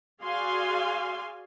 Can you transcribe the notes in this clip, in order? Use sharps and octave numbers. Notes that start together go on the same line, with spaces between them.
F#4 G#4 D5 F5 G#5 C6